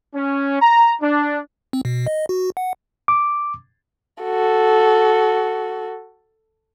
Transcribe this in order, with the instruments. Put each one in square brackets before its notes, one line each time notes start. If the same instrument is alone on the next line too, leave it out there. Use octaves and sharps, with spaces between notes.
[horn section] C#4
A#5
D4
[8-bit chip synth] C4
B2
D#5
F#4
F#5
[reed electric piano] D6
[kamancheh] F#4 A4